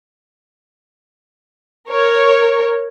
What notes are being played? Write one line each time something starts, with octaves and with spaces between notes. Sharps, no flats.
A#4 C#5